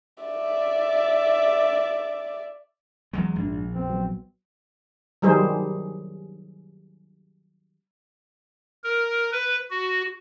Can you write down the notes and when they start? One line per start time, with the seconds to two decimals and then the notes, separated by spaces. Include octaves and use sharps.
0.24 D5 E5
3.13 E2 F#3 G#3
3.36 A#1 G#2 D4
3.71 F2 B3 C4
3.89 F#3 B3
5.22 D#3 F#3 G3 G#4 C5
8.84 A#4
9.32 B4
9.70 F#4